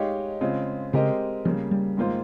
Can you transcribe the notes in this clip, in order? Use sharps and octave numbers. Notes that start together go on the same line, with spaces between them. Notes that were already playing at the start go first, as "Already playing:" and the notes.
Already playing: G#3 D#4 G4 C#5 F5
C#3 G#3 C4 F4
C#3 G#3 C4 G4 A#4 D#5
C#3 F3 G3 A#3
G3
G#2 D#3 A#3 F4 C5